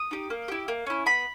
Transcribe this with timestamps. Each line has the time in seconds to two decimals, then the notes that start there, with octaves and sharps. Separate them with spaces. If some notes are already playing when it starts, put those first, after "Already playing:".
Already playing: D#6
0.11 D#4 G4
0.30 A#3
0.48 E4 G4
0.68 A#3
0.86 C#4 E4
1.06 B3 B5